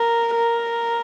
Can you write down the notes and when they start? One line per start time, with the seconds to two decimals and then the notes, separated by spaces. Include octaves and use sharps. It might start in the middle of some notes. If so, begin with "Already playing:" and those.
Already playing: A#4
0.36 A#4